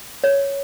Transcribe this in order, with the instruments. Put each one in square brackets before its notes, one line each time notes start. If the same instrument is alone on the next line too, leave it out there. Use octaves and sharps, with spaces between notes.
[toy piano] C#5